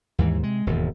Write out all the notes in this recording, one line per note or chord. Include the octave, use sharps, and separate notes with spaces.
D#2 G#2 E3
C3 G#3
E1 D#2 G#2